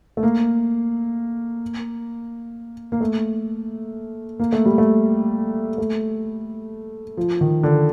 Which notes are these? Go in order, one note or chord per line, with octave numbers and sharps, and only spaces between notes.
A3
A#3
A#3
A3
A#3
A3
G3
A3
A3
F3
D#3
D3